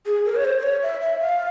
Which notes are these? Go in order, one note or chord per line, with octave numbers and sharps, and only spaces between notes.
G#4
A#4
C#5
C5
C5
C#5
E5
E5
F5